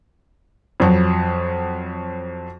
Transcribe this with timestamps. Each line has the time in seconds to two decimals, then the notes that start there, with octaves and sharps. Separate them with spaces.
0.80 F2 F#3